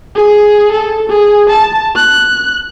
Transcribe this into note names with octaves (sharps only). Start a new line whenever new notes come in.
G#4
A4
G#4
A5
F#6